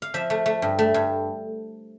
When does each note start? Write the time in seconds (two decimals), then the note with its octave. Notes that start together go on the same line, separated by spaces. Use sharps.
0.02 F5
0.14 F3 E5
0.30 A3
0.46 A3
0.62 G2
0.79 A3
0.94 G2